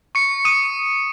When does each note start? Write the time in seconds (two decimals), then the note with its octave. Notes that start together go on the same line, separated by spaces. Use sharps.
0.15 C#6 C#7
0.45 D#6 D#7